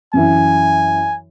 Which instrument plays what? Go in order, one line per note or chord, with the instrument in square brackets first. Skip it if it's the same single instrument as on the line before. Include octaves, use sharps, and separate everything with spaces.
[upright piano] F#2 E3 [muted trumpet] G#5